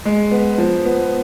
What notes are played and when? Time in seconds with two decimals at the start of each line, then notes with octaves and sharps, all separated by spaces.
0.05 G#3
0.31 B3
0.58 F3
0.85 B3